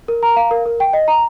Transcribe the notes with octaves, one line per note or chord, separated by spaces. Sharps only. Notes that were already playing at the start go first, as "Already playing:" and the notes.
A#4
A#5
F5
A#4
A#4
G5
D#5
A#5